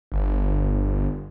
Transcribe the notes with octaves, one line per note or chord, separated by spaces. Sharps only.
G1